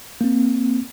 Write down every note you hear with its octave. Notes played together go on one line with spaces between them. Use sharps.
A#3 C4